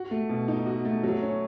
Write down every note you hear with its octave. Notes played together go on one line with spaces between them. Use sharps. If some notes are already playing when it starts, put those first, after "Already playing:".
Already playing: F#4
A3
B2
D#4
F#4
A3
F#3
C#4